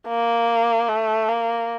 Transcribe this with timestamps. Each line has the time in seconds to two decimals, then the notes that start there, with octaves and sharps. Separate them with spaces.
0.08 A#3
0.88 A3
1.29 A#3